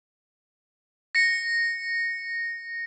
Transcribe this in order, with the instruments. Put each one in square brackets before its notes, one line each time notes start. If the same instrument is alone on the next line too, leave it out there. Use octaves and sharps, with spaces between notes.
[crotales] A#6 C#7